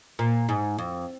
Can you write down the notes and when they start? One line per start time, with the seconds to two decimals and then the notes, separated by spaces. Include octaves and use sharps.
0.19 A#2
0.49 G#2
0.78 F2